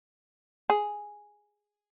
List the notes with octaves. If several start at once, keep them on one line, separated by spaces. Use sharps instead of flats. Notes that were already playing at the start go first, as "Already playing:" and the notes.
G#4